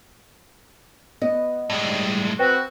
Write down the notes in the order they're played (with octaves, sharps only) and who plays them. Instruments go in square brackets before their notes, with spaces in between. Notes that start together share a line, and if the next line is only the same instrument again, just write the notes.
[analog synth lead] B3 [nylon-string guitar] D#5
[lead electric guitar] A2 G#3 [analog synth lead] G3
[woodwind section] C4 F#4 [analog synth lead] B4